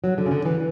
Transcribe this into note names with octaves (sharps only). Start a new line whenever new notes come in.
F#3
D3
C#3
D3
E3